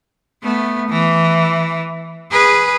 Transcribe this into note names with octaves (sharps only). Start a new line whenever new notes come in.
A3 B3
E3
G#4 B4